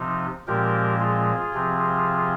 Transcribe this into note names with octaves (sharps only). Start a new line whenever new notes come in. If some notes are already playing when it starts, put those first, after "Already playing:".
Already playing: C3 F3 C4 D#4
A#2 F3 G#3 C4 G4 A#4
F4 G#4
C3 F3 C4